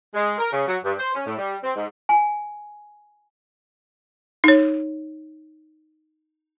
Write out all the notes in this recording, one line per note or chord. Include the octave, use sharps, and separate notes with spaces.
G#3
A#4
C#3
F#3
G2
C5
C#4
A2
G3
C4
G#2
G#5
D#4 C#5